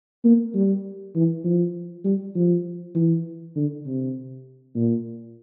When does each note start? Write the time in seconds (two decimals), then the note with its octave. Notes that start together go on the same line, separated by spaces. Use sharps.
0.24 A#3
0.54 G3
1.15 E3
1.44 F3
2.05 G3
2.35 F3
2.95 E3
3.56 D3
3.86 C3
4.75 A#2